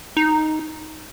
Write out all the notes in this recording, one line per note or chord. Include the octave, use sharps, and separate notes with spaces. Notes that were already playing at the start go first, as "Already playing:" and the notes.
D#4